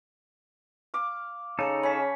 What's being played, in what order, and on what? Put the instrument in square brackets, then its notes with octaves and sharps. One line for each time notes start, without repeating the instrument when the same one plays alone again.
[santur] F5 D6
[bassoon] C#3 [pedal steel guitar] D#4 A4 [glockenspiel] A5 G6 C#7
[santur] C#4 [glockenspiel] B5 B6